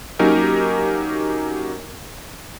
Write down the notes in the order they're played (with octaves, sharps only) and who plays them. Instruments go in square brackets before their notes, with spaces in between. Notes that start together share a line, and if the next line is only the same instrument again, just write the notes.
[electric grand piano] F#3 A#3 C#4 D#4 G4 A#4